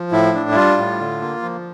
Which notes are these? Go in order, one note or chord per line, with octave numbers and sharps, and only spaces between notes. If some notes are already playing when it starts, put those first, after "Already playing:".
Already playing: F3
A2 E4
D4
E4
G3 F4
A2
D3
A#3
F3